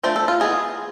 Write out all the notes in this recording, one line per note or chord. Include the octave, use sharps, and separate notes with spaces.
F3 A3 D4 C5
A4
F4
E3 G#3 B3 G#4